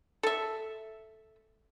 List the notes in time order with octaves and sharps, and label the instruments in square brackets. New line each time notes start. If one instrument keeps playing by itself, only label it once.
[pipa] A4 E5